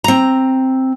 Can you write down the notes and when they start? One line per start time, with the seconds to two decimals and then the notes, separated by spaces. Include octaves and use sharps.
0.04 C4 A#5